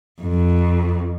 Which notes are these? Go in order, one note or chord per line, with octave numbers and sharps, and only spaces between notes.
F2